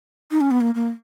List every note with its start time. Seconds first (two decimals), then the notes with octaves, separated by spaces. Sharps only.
0.31 D#4
0.41 C#4
0.51 B3
0.61 A#3
0.75 A#3